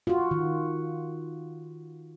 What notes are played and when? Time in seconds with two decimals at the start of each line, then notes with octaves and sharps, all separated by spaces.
0.07 F4 F#4
0.31 D#3